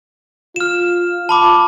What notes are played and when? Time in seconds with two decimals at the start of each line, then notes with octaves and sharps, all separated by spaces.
0.56 F4 F6 E7
1.29 A5 B5 D6